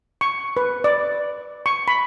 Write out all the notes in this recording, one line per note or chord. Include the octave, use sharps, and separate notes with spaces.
C#6
B4
D5
C#6
B5